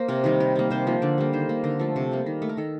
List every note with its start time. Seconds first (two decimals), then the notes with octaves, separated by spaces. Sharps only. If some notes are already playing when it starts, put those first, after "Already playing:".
Already playing: A#3 C5
0.08 C3 A#4
0.24 D#3 G3 A#4
0.40 D#3 A#4
0.56 G3 A#3
0.70 C3 C5
0.87 F3 A#3
1.02 D3 D5
1.18 G3 A#3
1.33 D#3 C5
1.49 A#3
1.64 D3 A#4
1.79 F3 A3 A4
1.96 C3
2.12 G3 A#3
2.26 D#3
2.42 A3
2.49 A#4
2.57 D#3 A4